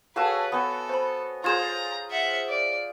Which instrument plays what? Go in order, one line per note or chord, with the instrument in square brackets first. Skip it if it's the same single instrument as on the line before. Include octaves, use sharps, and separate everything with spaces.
[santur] F#4 A4 C#5 [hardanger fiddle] G#4 B4 [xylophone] F5 A5
[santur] B3 G#5 [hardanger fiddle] A4
[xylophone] C5 B5
[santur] F4 G#4 C5 [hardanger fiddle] A#5 [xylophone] C6 G#6 E7
[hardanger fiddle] E5 F#5
D5